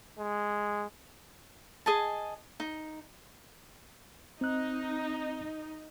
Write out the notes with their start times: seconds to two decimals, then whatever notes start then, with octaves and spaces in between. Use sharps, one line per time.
0.19 G#3
1.86 G#4 D#5 G#5 A5
2.60 D#4
4.41 C4 D#4 F#6